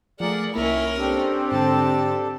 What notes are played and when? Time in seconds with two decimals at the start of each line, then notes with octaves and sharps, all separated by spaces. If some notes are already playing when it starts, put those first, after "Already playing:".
0.20 F3 A3 G#4 A#4 D5 F#5
0.54 C2 D#3 A#3 C#4 E4 A#4 E5 B5
0.97 C4 D4 G4 A4
1.52 G#2 D3 A5